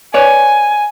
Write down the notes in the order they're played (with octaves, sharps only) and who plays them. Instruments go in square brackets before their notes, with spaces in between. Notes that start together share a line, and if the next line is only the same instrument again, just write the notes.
[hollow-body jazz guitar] B4 C#5 D5 [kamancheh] G#5